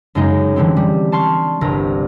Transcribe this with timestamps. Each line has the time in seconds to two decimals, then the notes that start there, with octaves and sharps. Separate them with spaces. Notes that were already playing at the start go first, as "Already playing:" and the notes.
0.15 F#2 C#3 G#3 D#4
0.56 D3 E3 G3 G#3 C4
0.76 G3
1.12 A5 C6 C#6 F6
1.61 G1 C2 A#4